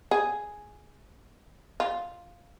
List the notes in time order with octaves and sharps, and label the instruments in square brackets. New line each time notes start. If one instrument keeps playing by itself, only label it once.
[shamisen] G#4
F4